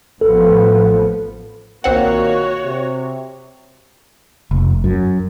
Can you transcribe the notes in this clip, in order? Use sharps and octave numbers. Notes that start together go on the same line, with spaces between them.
A1 F3 B3 A4
B1 A#2 D#3 A#3 C4 F#4 C#5 F#5
C3
F1
F#2